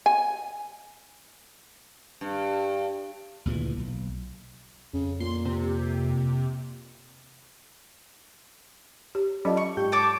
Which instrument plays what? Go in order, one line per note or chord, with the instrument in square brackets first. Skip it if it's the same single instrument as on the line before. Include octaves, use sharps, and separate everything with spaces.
[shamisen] G#5
[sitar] G2
[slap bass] D2 A#2 C#3 E3
B1
[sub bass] F2 [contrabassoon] C#3
[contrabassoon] A#2 [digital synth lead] C6
[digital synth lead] C3
[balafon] G4
[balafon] F#3 C#4 D#5 [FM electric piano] F4 A4 D5
[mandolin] C#6
[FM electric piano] G#2 G4 G6
[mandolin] C#5 A5 D6